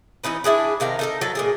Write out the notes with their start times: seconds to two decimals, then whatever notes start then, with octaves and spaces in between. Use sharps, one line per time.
0.24 E3 C#4 D#4 B4
0.44 D4 E4 G#4 B4
0.80 C3 D#3 F5 A#5
0.99 D#4 A4 A#4
1.21 F#3 A4
1.35 A#2 G#3 G#4